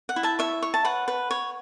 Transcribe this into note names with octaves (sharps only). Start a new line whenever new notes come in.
F#5
E4
E5 A5
C#5 E5
C#5
A5
B4 F#5
B4
C#5